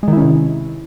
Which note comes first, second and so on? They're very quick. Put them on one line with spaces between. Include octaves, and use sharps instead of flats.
G#3 D#3 E4 C#4 C3